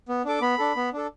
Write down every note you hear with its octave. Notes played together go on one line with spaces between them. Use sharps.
B3
D4 A4 D6
B3 B5
D4 A4
B3
D4 A4